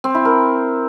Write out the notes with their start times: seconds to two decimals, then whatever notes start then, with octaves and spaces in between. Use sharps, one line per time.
0.04 C4
0.15 E4
0.25 A#4